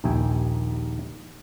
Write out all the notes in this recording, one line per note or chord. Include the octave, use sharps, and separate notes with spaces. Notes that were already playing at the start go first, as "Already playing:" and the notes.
A#1 D#2 E5 G5 G#5